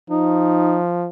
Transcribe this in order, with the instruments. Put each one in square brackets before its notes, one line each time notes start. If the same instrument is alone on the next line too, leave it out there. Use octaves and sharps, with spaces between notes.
[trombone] F3 [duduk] D#4